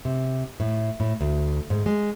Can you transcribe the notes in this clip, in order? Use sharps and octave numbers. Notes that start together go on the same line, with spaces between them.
C3
A2
A2
D2
G#2
G#3